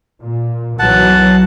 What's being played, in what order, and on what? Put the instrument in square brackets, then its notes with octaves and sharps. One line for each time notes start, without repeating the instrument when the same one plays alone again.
[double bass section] A#2
[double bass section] B1 E3 F#3 [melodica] F#5 A5